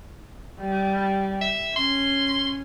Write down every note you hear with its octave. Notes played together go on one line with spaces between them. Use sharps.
G3
E5
C#4 C6